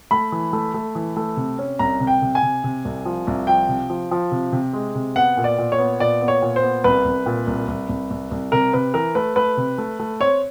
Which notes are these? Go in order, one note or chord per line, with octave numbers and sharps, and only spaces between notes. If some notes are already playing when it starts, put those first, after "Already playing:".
A3 B5
E3
A3
A3
E3
A3
C3
C#4
C2 A#5
C3
G5
C3
G#5
C3
C3
C2
F3
C2
F3 G5
C3
F3
F3
C3
C3
G#3
C3
B3 F#5
A#2
D5
A#2
C#5
B3
A#2 D5
B3
C#5
A#2
C5
B3
C2 B4
C2
A#2
C2
C2
C2
C2
C2
C3 A#4
C3 B4
E3 A#4
A3 B4
A3 B4
C3
A3
A3
C4 C#5